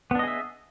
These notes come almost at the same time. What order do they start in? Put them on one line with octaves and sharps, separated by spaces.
B3 D4 D#5 G#4 E5